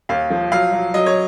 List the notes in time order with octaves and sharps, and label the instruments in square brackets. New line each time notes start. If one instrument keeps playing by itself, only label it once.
[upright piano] D#2 F5
F3
F#3 F5
F#3
F#3 D#5
C#5